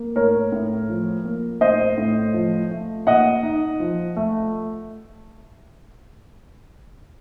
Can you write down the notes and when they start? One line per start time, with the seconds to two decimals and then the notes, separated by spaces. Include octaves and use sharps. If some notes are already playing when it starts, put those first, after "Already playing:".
Already playing: A#3
0.16 A2 A#4 C#5
0.52 A2
0.89 F3
1.25 A#3
1.61 A2 C5 D#5
1.98 A2
2.34 F3
2.71 A3
3.07 A#2 D#5 F#5
3.43 D#4
3.80 F3
4.16 A3